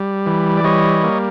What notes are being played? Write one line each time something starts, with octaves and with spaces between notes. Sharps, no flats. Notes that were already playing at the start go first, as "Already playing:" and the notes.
Already playing: G3
E3
D5
G3 C#5 D#5
A#3